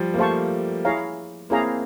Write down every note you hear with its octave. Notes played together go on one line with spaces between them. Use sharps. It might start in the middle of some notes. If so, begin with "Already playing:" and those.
Already playing: F3 G3
A#3
G3 A3 C5 F5 A5 C#6
E4 G#4 C#5 F5 A#5
A#3 C4 E4 G#4 C#5 F5 A#5